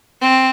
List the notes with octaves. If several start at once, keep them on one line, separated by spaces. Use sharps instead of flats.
C4